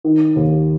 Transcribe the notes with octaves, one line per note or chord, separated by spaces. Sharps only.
D#3
D#2